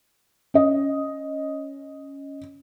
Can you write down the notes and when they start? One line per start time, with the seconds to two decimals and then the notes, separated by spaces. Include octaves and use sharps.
0.54 C#4 D#5